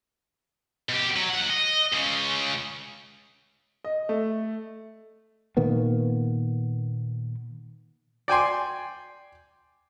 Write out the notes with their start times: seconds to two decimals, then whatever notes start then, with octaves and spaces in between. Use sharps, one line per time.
0.89 B2 G4
1.16 F#3
1.30 D#2 F#5
1.50 D#5
1.93 C#2 C#3
3.85 D#5
4.09 A3
5.57 A#2 D#3 A#3 B3
8.28 D5 G5 G#5 C6